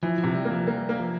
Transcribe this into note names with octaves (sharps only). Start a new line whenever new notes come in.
E3 F3
F3
C3
G3
A#3
F3
G3 A#3
A#3
F3